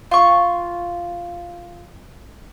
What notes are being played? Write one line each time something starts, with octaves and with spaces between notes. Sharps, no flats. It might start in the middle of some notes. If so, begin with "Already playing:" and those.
F4 C#6